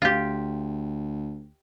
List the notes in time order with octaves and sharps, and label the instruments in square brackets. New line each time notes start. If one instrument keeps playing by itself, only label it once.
[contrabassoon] D2 [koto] F4 G4